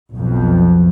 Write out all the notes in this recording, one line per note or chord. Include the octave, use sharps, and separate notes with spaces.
B1 F2